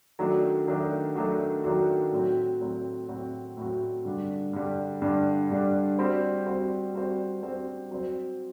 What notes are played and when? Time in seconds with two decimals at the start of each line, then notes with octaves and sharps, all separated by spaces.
0.19 D#3 F#3 A3 D4 F#4
0.68 D#3 F#3 A3 D4 F#4
1.15 D#3 F#3 A3 D4 F#4
1.64 D#3 F#3 A3 D4 F#4
2.12 A2 F#3 C4 F#4
2.60 A2 F#3 C4 F#4
3.08 A2 F#3 C4 F#4
3.57 A2 F#3 C4 F#4
4.05 G2 D3 G3 D4
4.53 G2 D3 G3 D4
5.02 G2 D3 G3 D4
5.50 G2 D3 G3 D4
5.99 G3 C4 F#4 C5
6.46 G3 C4 F#4 C5
6.94 G3 C4 F#4 C5
7.43 G3 C4 F#4 C5
7.91 F#3 C4 F#4 C5